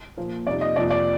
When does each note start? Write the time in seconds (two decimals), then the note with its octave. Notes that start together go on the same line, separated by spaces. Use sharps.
0.17 A#2 F3 A#3
0.47 F2 C3 G3 A#3 D#4 D5
0.61 D#5
0.76 F2 C3 F3 A#3 D5
0.90 D5